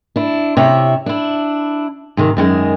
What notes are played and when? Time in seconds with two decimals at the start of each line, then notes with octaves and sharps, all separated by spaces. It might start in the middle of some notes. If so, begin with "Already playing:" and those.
0.16 D4 E4
0.57 C3 E4 C#5 E5
1.06 D4 E4
2.17 G#2 C3 D#3
2.37 F#2 D#3 G#3